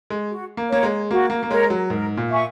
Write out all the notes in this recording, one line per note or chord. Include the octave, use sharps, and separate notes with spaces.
G#3
F#4
A#3
A#3 A#4 C#5
G#3
A#3 F#4
A#3
A#3
G#3 A#4 C#5
F#3
G#2 A#4
A#2
E5 G#5 C#6